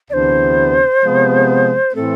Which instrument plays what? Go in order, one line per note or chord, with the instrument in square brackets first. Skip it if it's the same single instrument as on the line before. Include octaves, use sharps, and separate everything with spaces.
[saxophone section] D2 C3 E3 B3 D4 [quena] C5 D5
[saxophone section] C3 F3 G#3 B3
[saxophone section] A2 E3 A3 C4 [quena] A4